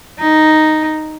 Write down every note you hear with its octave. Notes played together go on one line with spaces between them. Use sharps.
D#4